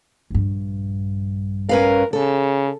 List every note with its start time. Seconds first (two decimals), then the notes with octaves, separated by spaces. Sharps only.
0.30 A#1 G2
1.69 C#4 A#4 B4 F5
2.13 C#3 A4